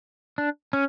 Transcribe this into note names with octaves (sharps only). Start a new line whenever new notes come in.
D4
C#4